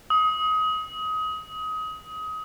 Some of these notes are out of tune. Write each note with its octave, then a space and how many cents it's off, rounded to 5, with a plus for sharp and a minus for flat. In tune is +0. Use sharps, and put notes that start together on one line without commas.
D#6 +25